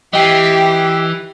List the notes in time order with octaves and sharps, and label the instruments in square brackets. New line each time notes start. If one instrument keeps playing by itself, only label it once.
[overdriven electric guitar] E3 [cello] G4 [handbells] D#5 G5 C7